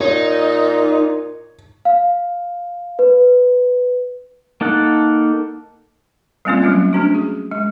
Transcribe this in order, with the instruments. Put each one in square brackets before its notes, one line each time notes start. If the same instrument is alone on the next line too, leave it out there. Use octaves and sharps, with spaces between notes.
[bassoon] A#2 [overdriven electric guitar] D#4 [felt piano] C#5
[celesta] F5
B4
[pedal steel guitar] A#3 D#4 A4 F#5
[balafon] G3 A3 A#3 C4 C#4 F4
F#3 A3 A#3 C#4
A3 C#4 D4 F#4
G#4
G#3